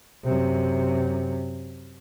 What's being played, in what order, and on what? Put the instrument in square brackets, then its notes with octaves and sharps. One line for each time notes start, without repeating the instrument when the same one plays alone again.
[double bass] F#2 C3